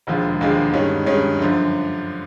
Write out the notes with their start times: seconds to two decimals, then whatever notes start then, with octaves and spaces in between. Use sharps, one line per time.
0.07 E1 D#2 D3 F3 G#3
0.41 E1 D#2 D3 F3 G#3
0.73 G2 D#3 G#3 C#4
1.06 G2 D#3 G#3 C#4
1.39 F#2 D3 F3